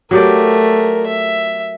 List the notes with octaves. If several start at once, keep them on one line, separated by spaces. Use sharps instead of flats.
F#3 A3 G4 A#4 D5
E5